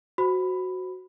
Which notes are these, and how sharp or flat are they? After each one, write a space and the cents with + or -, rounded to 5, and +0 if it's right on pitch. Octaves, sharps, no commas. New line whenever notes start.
F#4 +0 C5 -15 B5 +10